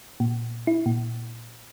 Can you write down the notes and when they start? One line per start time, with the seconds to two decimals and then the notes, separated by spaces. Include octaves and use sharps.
0.20 A#2
0.67 E4
0.86 A#2